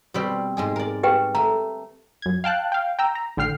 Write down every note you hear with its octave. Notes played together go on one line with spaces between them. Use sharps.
B2 G3 C4
G#2 G#3 G#4
A#4 D5
G4 B4 G5
A3 A#5
F#2 G#6
F5 G5 A5 F#6
F5 G5
G5 A#5 E6
A#5
A1 D3 G5 F6 C7